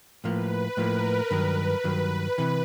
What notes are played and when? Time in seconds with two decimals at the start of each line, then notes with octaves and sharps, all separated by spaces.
0.24 A2 F3 A#3 B4
0.77 A2 F3 A#3 A#4
1.31 G2 D#3 F#3 B4
1.84 G2 D#3 F#3
2.38 C3 E3